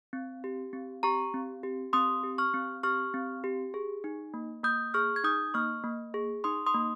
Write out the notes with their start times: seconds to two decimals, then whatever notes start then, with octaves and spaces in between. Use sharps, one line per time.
0.13 C4
0.44 G4
0.73 C4
1.03 G4 A#5 C#6
1.34 C4
1.63 G4
1.93 C4 C6 D#6
2.24 G4
2.38 C#6 F6
2.54 C4
2.83 G4 C#6 F6
3.14 C4
3.44 G4
3.74 G#4
4.04 D#4
4.34 A#3
4.64 A#3 D#6 G6
4.94 G#4 C#6 F6
5.16 G#6
5.24 D#4 D#6 G6
5.54 A#3 C#6 F6
5.84 A#3
6.14 G#4
6.44 D#4 C6 D#6
6.66 C6 D#6
6.74 A#3